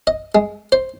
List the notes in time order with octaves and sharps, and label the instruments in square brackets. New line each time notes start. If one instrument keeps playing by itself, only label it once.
[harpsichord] D#5
G#3
C5